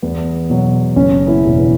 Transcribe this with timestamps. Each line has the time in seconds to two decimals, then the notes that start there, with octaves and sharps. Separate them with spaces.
0.02 E2 B3
0.50 B2 F#3
0.96 F#1 C#4
1.27 B3 E4
1.43 E2 B2 F#3
1.59 B3 E4